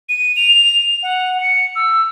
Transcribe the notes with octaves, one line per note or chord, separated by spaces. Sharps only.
D#7
F7
F#5
C#7
E6